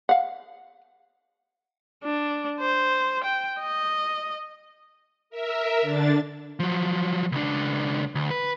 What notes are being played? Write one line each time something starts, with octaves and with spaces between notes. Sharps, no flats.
F5 F#5
D4
C5
G5
D#5
A#4 E5
D3 D4 A6
F3 F#3
C#2 D4
D2
B4